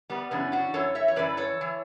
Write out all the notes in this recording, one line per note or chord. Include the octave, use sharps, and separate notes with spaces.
G3 B3
F#2 C#3 E3 B3 D4
D4 F#4
F#2 E3 A4 C#5
C#5 E5
C#5
F#2 E3 B4 D5
A4 C#5
E3